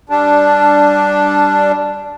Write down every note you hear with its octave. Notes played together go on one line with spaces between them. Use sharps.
G3 D4